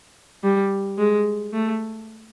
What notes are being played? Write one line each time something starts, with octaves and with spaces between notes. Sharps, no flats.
G3
G#3
A3